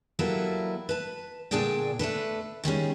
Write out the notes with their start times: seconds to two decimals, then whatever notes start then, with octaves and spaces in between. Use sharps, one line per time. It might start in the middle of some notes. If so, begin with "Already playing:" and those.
0.19 F#3 G3 A#3 E4 A4 B4
0.89 B4 A5
1.51 A#2 D3 D4 G#4 D5 G5
1.99 A3 D4 A4 B4
2.64 D#3 G3 G#3 C#4